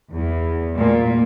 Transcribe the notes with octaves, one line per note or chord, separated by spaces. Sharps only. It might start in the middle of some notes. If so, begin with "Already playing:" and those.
E2
A#2